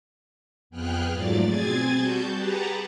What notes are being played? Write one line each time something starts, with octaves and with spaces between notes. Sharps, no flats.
F2 B3 G#4 G5 F6 F#6
G#2 F3 F#3 A3 D5 A6
B2 C4 G#4 G#5 G#6 A6
G3 F#4 A5 G6
G4 G#4 B4 F#5 A5 A#5